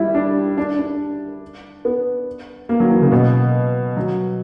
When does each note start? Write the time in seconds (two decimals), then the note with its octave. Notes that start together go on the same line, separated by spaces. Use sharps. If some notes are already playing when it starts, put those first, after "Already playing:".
Already playing: G3 E4
0.14 D4
0.57 D4
0.79 D4
1.85 B3
2.69 A#3
2.80 F#3
2.90 E3
3.02 C#3
3.12 B2
3.97 F#3